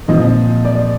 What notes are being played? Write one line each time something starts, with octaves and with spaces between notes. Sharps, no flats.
A#2 F3 C4 D#5
D5